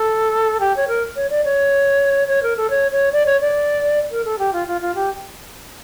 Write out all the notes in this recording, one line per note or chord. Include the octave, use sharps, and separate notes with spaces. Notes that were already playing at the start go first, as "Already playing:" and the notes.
Already playing: A4
G4
C#5
A#4
C#5
D5
C#5
C#5
A#4
A4
C#5
C#5
D5
C#5
D5
A#4
A4
G4
F4
F4
F4
G4